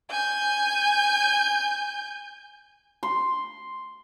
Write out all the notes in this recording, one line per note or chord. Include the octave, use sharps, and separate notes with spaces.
G#5 G6
C6